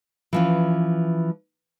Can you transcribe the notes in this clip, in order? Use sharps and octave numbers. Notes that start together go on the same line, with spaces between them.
E3 F3 C#4